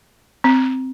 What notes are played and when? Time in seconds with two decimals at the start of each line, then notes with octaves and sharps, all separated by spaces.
0.44 C4